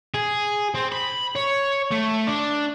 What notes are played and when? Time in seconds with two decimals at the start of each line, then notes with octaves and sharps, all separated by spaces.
0.14 G#4
0.74 C4
0.92 B5
1.36 C#5
1.91 A3
2.27 D4